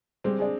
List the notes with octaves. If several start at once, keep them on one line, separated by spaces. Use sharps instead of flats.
G3 G#3 C4
D4 G#4 D5